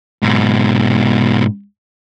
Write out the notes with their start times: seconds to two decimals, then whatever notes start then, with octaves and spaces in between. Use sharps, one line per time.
0.22 G#2 B2